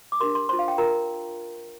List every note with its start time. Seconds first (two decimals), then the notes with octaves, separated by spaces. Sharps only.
0.12 D6
0.20 D4 G4 A#4 C6
0.35 C6
0.49 F4 C5 C6
0.59 F5
0.68 G5
0.78 F4 A#4 A#5